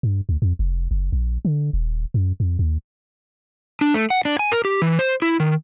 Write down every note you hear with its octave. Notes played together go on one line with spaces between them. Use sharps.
G2
D2
F2
F1
F#1
A#1
D3
D#1
F#2
F2
D#2
D4
A3
F#5
D4
G#5
A#4
G4
E3
C5
E4
D#3